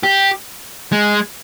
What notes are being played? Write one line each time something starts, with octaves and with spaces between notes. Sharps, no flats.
G4
G#3